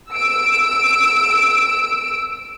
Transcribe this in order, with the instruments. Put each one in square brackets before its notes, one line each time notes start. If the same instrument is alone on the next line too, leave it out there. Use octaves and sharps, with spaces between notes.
[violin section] E6 D7